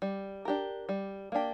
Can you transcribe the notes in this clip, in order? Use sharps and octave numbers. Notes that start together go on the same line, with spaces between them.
G3
D4 G4 A#4
G3
A#3 D4 G4